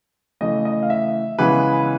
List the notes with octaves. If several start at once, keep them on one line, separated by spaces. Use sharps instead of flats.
C#3 E3 A3 D#5
D#5
F5
E5
C#3 E3 G#3 B3 B4